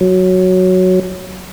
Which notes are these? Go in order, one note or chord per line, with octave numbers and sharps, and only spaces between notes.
F#3